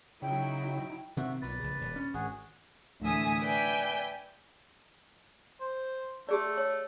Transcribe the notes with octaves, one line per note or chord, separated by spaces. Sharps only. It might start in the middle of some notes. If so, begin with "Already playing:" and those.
C#3 F#3 D#4 E4 G5
C3 D#3 C4 F#4 E5
B1 A#2 B4 D5
A#1 C#3
D#1
C#4
G#1 F#4 G#4
D2 A2 E3 E5 G#5 D#6
B4 D5 E5 G5 G#5 G6
C5
A3 G4 G#4 D5
C#5